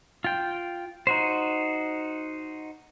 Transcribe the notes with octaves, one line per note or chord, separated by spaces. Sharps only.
F4 G5
D#4 F#4 C5